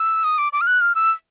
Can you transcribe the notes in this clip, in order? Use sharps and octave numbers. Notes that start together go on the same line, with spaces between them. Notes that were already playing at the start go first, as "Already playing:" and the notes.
Already playing: E6
D#6
D6
D6
F6
F#6
F6
E6